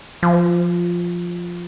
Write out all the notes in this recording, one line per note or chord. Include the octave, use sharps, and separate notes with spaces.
F3